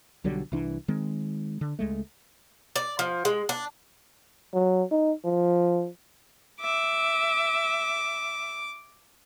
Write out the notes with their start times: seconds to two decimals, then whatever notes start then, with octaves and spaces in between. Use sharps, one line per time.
0.24 B1 D3 F#3 G3
0.52 C2 E3 D4
0.88 D#3 G#3 C4
1.61 D3
1.79 C#2 G#3 A3
2.76 D5
2.99 F3
3.25 G#3
3.49 D4
4.54 F#3
4.91 D#4
5.25 F3
6.61 E5 D6